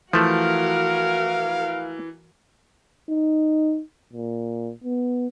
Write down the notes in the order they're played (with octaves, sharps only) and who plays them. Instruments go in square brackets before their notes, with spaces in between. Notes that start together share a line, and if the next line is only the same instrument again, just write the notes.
[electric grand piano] E3 [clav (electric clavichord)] F3 A3 [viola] F#4 A#4 [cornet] F5
[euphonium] D#4
A#2
B3